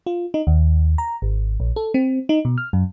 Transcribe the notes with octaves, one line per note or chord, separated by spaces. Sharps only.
F4
D#4
D#2
A#5
G#1
A#1
A4
C4
D#4
B2
F6
F#2